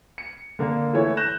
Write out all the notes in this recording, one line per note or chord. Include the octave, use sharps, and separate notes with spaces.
C#7
D3 A#3
E3 A3 E4 C#5
F#6 G6 A#6 E7